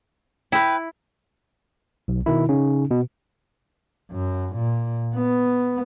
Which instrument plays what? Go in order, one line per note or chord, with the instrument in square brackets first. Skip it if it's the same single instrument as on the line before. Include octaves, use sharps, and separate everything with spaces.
[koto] E4 [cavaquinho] B4 G5
[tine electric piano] B1
B2 D#3 E4
C#3 C#4 D#4
B2
[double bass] F#2
A#2
B3